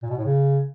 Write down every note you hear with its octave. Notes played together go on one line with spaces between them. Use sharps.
A#2
B2
A2
C#3